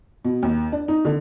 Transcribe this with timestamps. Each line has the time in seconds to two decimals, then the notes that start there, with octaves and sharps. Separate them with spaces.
0.25 B2
0.43 D#2
0.72 D4
0.88 D#4
1.05 D3